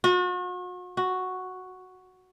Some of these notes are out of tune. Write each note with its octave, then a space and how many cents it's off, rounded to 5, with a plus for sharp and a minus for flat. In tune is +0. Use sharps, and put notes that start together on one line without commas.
F#4 -40
F#4 +0